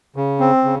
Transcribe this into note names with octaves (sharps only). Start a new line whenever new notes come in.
C#3
C4
C#3